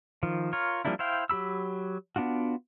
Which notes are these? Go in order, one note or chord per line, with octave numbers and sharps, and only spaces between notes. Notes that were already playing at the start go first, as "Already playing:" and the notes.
D#3 F3
F4 A#4 C#5
F3 G3 A#3 D4 E4
E4 C5 F5 G5
F#3 G4 B5 E6
B3 D4 F4 F#4